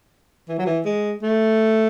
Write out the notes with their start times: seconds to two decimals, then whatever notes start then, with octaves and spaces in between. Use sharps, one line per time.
0.49 E3
0.58 F#3
0.66 E3
0.85 G#3
1.23 A3